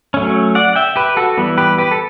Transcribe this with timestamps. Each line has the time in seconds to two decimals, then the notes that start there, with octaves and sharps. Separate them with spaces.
0.14 F#3 A3 C#4
0.55 D5 F#5
0.76 E5 G5
0.96 G4 B4
1.17 F#4 A4
1.38 E3 G3 B3
1.58 G4 B4
1.78 G4 B4
1.91 A4